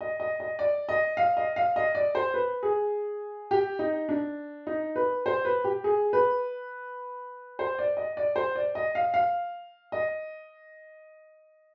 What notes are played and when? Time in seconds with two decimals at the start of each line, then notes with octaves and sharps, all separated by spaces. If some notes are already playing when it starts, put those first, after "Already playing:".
0.01 D#5
0.20 D#5
0.40 D#5
0.59 D5
0.89 D#5
1.17 F5
1.37 D#5
1.56 F5
1.76 D#5
1.95 D5
2.15 C5
2.34 B4
2.63 G#4
3.51 G4
3.79 D#4
4.09 D4
4.67 D#4
4.96 B4
5.26 C5
5.45 B4
5.64 G4
5.84 G#4
6.13 B4
7.59 C5
7.79 D5
7.97 D#5
8.17 D5
8.36 C5
8.56 D5
8.75 D#5
8.95 F5
9.14 F5
9.92 D#5